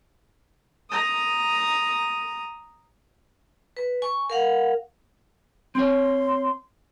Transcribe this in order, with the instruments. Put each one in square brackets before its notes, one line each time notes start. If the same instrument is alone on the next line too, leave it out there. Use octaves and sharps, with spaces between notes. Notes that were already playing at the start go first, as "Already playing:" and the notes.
[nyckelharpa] A#5 D#6
[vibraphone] B4
G#5 C#6
A#4 F5 F#5
[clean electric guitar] C4 C#5 [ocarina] C6